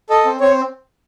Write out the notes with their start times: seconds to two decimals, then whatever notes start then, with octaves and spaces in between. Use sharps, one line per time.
0.10 A4 D#5
0.25 C4
0.40 C4 C#5